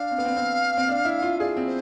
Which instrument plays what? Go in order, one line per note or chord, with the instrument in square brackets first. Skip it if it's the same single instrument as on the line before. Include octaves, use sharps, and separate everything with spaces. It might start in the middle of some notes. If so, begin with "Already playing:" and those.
Already playing: [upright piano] D4 [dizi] F5
[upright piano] C4
B3
C4
C4
C4
D4
E4
F4
[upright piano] G#4 [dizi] D5
[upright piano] C4
[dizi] C5